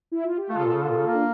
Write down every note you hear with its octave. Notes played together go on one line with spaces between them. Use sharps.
E4
F4
G4
A3 F4 A4
C#3
A#2
C#3
D3
A#2
C#3
A#3
D4 F4